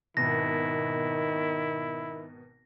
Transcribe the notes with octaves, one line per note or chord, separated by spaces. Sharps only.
G#1 B2 D#3 E4 A#6